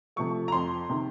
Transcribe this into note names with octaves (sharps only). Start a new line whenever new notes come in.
C3 F3 A3 C#6
A#5
F2 C6
C3 D#3